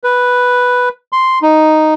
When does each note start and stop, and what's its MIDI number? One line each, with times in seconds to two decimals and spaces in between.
0.04 0.89 71
1.12 1.39 84
1.42 1.94 63